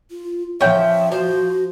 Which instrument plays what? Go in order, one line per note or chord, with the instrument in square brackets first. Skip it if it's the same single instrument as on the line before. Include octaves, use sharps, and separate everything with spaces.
[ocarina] F4
[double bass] F3 [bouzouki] C#4 G5 [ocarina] E5
[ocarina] F#4 [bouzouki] C5